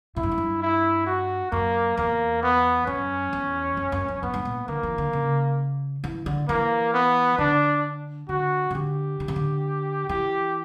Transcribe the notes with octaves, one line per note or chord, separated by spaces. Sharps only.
A#2 E4
G2
F#2
G2
E4
F#4
F#2 A#3
E2 A#3
B3
F#2 C#4
E2
F#2
F#2
F#2
G2 B3
G2
A#2
D3 A#3
E3
D3
C#3
E3
D3
E3 A#3
B3
D3 D4
D3 F#4
C#3
D3 G4
D3
C#3
D3
E3 G4